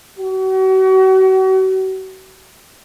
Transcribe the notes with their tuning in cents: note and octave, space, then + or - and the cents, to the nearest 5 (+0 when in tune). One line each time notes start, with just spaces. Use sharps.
F#4 +40